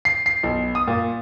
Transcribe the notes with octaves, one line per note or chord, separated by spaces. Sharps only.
C7
C7
B1
D#6
A#2